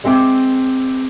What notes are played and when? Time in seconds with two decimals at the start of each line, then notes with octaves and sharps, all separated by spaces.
0.04 G#3 C4 E5 G5 D6